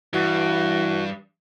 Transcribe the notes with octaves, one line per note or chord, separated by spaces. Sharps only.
G2 E3 F#4